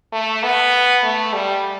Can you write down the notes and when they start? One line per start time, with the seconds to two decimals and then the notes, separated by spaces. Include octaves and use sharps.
0.13 A3
0.43 B3
1.03 A3
1.34 G3